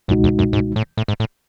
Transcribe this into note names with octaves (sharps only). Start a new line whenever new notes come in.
C#2 F#2 B2 G#3 D#4 F#4
E2
F#2
G#2
A2
A2
G#2
A2